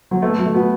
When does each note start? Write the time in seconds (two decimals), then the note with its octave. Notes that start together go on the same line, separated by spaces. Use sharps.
0.11 F#3
0.22 A3 B3
0.38 F#3
0.46 A3
0.54 B3 F#4